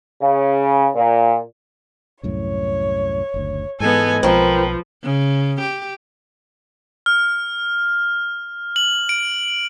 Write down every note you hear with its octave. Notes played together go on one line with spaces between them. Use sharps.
C#3
A#2
C2 F#2 A2 C#5
F#1 D2
G#2 E3 G#3 B3 A4 D#5 G#5
B1 F3 C4 A#4 B4
C#3
G4
F6
F#7
D7